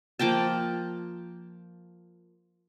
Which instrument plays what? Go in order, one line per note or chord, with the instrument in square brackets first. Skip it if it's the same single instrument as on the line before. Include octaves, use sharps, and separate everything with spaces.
[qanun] F3 A#3 G5 A5